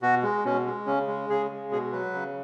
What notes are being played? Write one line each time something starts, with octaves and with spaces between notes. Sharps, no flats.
B2 F#4
G#3
B2 C#4
G#3
C#3 C#4
G#3
C#3 G#4
G#3
B2 G#4
F#3 B4
C#3